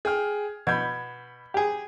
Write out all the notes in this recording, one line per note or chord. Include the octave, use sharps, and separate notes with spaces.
G#4 G5 F6
B2 B5 G6 G#6
G4 G#4